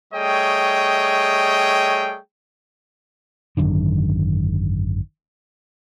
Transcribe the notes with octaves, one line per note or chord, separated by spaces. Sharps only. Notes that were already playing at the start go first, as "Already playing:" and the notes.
G3 A3 G#4 C#5 D#5 G5
G#1 F#2 D3 D#3